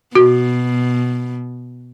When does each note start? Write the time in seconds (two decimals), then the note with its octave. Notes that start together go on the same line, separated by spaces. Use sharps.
0.15 B2 F#4